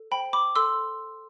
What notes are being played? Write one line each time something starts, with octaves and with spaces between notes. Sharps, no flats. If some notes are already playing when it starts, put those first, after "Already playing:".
Already playing: A4
C5 G5 B5
B5 D6
A4 C6 E6